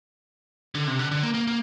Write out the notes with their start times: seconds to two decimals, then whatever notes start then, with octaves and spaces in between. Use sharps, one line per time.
0.75 D3
0.87 C3
0.99 D3
1.11 D3
1.23 A#3
1.34 A#3
1.47 A#3